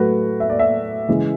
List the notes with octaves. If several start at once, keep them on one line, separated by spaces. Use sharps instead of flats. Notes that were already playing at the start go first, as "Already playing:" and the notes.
Already playing: A2 F#3 A3 F#4 B4
E5
D5
E5
C#3 E3 G#3